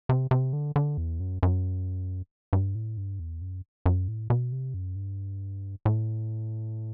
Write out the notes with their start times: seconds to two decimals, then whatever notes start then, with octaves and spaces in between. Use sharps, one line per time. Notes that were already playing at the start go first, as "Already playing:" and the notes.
0.09 C3
0.31 C3
0.53 D3
0.76 D3
0.97 E2
1.20 F#2
1.43 F#2
2.53 G2
2.75 A2
2.97 G2
3.20 E2
3.42 F#2
3.86 F#2
4.08 A2
4.30 B2
4.52 C3
4.74 F#2
4.96 G2
5.85 A2